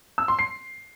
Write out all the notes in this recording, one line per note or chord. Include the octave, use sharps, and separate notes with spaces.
E6
C6
C7